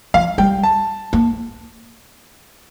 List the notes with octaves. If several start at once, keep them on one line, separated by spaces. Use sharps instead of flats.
F3 F5
G3 G5
A5
A#3